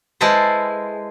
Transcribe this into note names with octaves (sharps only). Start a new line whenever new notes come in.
G#3 E4 A4 B4 C5